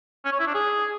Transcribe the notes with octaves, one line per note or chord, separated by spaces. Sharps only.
C#4
C#5
E4
D4
G#4